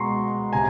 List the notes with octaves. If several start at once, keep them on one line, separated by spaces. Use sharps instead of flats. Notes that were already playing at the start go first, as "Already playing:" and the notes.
Already playing: B2 G#3 B3 A#5 C6 C#6
C3 G#5 A#5